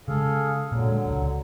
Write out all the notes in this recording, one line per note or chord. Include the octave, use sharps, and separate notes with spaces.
C#3 G#3 G#4 A4 F5
A#2 D3 F#3 A#3
G#3
D1 C#2